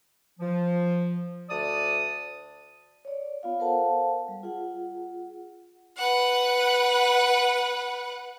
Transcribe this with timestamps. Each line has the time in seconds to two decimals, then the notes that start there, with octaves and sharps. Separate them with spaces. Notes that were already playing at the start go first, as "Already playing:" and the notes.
0.39 F3
1.49 D2 D5 A5 D#6
3.05 C#5 D5
3.43 B3 F4 F5
3.59 A4 A#4 C5 F5 F#5 A5
4.28 G3
4.43 F4 G#4 F#5
5.97 B4 F#5